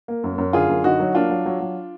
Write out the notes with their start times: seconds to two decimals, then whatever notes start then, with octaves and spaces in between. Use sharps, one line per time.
0.08 A#3
0.24 F#2
0.38 F#2
0.53 D3 F4 G#4
0.69 F#2
0.84 D3 D#4 F#4
1.00 F#3
1.15 A#3 D4 F4
1.30 F#3
1.46 F#3
1.60 F#3